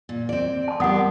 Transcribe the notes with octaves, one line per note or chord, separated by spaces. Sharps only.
A#2
C4 D5
A5 C6
G3 B3 A#4 F#5 D#6